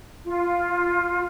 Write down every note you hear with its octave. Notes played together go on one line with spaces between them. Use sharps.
F4